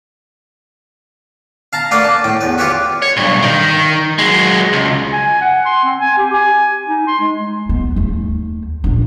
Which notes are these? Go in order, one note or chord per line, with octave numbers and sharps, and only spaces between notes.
F5 A5 A#5
A3 A#3 B4 D5 F5 F#5
A5
A2 G5
E2 B4
F4 G4 B4 C#5 E5 F#5
C#5
B1 G2
D#3
F#3 G#3
C#2
G#5
F#5
C6
C4
G#5
G4
G#5
D#4
C6
G#3
B3
D#2 A3
A#2 D4